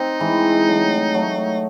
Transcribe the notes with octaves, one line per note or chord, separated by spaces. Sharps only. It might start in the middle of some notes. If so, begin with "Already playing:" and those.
Already playing: C4 D#4
E3 G#3
F#3 A3
F#3 A3